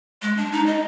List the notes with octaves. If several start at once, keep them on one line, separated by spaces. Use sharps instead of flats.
G#3
D4
D#4
D#5